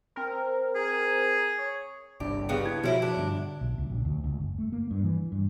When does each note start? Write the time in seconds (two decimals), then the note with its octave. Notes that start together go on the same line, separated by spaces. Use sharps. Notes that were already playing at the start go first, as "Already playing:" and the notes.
0.16 C4 A#4
0.75 G#4
1.59 C#5
2.20 G1 C2 D4 G4
2.49 C#3 B3 D#4 G4 F5 G5
2.65 E4 G#6
2.84 B2 F3 G3 E4 F#4 A#4 C#5 E5
3.02 D4
3.17 G2 D3
3.61 B1
3.78 C#2
3.90 A#1
4.05 D2
4.24 C#2
4.40 F#1
4.58 A3
4.72 A#3
4.91 G2
5.04 E3
5.32 G2